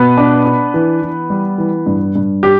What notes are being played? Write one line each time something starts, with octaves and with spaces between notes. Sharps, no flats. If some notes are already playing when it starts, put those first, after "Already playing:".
Already playing: B2 B3 B4
D4
D4
E3
E3
G3
E3
G2
G2
G4